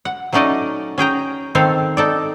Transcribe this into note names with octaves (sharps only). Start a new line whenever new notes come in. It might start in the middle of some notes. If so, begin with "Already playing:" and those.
F#5
F#3 A3 C#4 D#4 D5 D#5
C#4 G#4 G5 A#5
D#3 C4 A4 F5
D#4 A4 D5